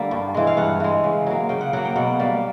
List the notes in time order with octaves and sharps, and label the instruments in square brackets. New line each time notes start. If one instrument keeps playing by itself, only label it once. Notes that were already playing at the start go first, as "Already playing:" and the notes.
Already playing: [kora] D3 G3 A#3 F#5
G2
E3 G#3
F5
G2 F#5
E3 G#3
C#3
F#3 A#3
C#3 G5
F#5
F#3 A#3 F#5
G5
B2 F#5
G3 A#3